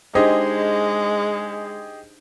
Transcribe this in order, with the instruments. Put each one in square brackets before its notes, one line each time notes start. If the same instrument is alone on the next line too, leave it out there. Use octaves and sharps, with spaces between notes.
[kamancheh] G#3 [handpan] D4 D#4 C5 [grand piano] G4 G#4 D#5